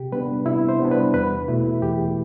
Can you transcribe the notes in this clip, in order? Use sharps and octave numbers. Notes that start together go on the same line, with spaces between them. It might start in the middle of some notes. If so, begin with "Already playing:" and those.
Already playing: C3 G4
G3 B3 D4 B4
C3 E4
C5
G3 B3 D4
B4
E2 B4
B2 A3 E4
E2 G4